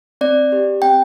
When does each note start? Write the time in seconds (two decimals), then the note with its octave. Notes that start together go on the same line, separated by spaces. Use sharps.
0.21 C4 D5
0.52 G4
0.82 C4 G5